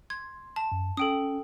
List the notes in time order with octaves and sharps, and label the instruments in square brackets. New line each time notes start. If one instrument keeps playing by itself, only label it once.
[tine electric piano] C6 [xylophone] G#6
[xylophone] A5
[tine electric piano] F#2
[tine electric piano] C#4 [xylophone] A4 G5 D#6